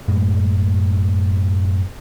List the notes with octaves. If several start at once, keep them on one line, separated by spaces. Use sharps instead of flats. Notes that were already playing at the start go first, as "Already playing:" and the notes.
F#2 A2 G#3